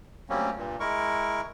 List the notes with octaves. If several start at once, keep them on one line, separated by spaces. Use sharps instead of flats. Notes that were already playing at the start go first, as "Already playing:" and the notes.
D2 F#3 G3 A#3 C4 C#4
G2 A#2
G#3 E4 A#4 C#6